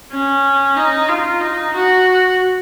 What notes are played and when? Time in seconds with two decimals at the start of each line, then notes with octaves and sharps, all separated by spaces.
0.12 C#4
0.77 D#4
1.09 F4
1.41 D#4
1.74 F#4